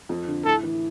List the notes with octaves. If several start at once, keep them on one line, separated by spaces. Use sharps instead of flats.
F2
D3
A2 A4
E3